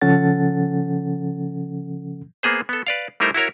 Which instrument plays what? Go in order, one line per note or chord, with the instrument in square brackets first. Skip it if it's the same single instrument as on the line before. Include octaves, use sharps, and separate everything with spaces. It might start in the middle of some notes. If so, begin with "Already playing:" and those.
[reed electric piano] C#3 F3 C#4 A4 F#5 A6
[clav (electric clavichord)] A#3 B3 G#4 C5
B3 A4
B4 D5 F5
G3 A3 D#4 E4 A#4 C5
E4 F#4 A#4 C#5